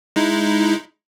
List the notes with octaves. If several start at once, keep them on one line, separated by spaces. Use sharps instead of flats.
G#3 D#4 E4